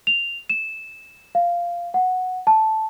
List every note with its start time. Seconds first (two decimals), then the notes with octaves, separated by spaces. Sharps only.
0.07 F7
0.50 E7
1.35 F5
1.94 F#5
2.47 A5